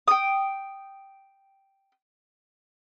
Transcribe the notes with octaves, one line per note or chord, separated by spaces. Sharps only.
G5 D#6